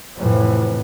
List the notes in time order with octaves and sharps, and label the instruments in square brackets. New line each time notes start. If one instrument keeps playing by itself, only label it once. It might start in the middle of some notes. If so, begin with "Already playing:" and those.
[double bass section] F2 A2 C3 E3